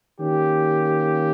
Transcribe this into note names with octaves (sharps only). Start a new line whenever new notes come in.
D#3 A#3 C#4 G4